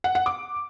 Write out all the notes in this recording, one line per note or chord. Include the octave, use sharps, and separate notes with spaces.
F#5
F#5
D6